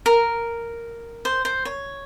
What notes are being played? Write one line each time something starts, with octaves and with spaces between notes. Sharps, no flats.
A#4
C5
C5
C#5